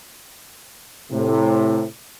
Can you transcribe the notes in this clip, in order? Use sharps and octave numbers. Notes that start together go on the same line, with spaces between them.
A2 C3